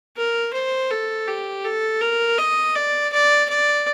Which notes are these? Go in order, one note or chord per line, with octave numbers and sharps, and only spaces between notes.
A#4
C5
A4
G4
A4
A#4
D#5
D5
D5
D5